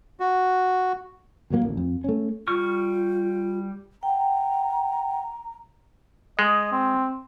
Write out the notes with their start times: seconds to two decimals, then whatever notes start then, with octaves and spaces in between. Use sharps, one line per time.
0.20 F#4
1.50 D#2 A2 F#3 A#3
1.63 A1 D2
1.77 F2
2.04 A3 C#4
2.48 G3 F4 C#6 F6
4.03 F#5 G5 A#5
6.39 G#3 D#5
6.72 C4